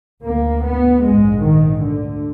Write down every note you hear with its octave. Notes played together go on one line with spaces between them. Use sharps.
D2 A#3
B3
A#1 G#2 G#3
D#3
D2 D3